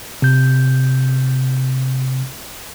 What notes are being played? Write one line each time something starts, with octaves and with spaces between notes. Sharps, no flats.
C3 G6